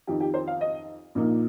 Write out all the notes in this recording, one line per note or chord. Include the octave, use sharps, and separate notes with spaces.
F2 D#3 C4 D#4 G4
G4
C5
F5
D#5
A#1 A#2 A#3 D#4